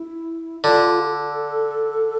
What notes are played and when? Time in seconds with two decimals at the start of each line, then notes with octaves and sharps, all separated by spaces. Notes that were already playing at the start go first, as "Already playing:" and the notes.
Already playing: E4
0.64 D3 F4
1.00 A4